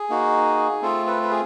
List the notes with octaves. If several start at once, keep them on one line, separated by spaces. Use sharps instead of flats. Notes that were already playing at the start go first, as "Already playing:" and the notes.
Already playing: G#4
A#3 D#4 F#4
A3 C4 F4 A4
A4 B4
B4
G#4